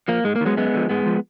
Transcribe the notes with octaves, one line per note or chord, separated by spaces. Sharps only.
F3 A#3
G#2 G#3
A#3
D#3
F#3 G#3 B3
F#2 G#3 B3
D3 F3
G#2 G#3 B3
F3